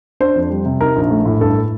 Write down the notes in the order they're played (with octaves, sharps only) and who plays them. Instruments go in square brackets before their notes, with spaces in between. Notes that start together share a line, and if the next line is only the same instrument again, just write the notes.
[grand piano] D4 C5
F2
G3
C3
D#4 A#4
A#1
A3
A2
G2 A4